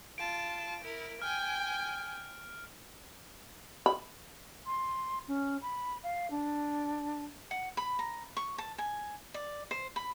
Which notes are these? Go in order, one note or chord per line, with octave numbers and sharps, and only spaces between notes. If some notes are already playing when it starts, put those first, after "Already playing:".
F4 A5 D7
E4 A#4
G5 G#5 F6
B5
C6
C#4
B5
F5
D4
F#5
B5
A#5
C#6
A5
G#5
D5
C5
B5